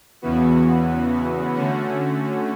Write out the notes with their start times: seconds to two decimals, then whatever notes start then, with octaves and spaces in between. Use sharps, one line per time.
0.22 E2 C#3 E3 B3 F#4
1.54 D3 A3 C#4 F#4